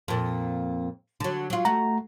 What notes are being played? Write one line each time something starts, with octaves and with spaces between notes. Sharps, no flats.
F2 A#2
D3 F#3
F#3 F4
A3 F#4 A#5